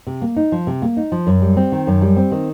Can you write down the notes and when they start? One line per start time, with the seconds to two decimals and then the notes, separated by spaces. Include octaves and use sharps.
0.07 C3
0.22 A#3
0.37 D#4
0.52 F3
0.67 C3
0.82 A#3
0.97 D#4
1.12 F3
1.27 F#2
1.42 G3
1.57 C4
1.72 D#3
1.87 F#2
2.02 G3
2.17 C4
2.32 D#3